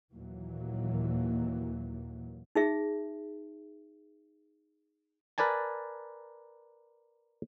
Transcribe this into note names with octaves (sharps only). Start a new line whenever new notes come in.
D#2 A#2 E3 F#3 A#3
D#4 G#4 E5
A#4 B4 D5 G#5 A5